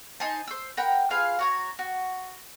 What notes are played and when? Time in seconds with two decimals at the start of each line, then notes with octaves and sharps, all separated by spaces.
0.20 D#4 C5 G#5 A5
0.47 C5 E6
0.77 A#4 F#5 G5 B5
1.10 F4 G#4 B4 F5
1.39 F#4 C#5 A#5
1.79 F#4